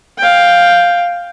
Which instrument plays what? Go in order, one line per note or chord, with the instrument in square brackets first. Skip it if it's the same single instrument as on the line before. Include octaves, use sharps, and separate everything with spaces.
[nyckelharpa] F5 G5